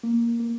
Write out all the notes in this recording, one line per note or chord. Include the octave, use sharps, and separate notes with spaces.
A#3
A#3